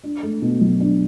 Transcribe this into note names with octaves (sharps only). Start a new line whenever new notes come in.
D4
A3
B2
B1
D4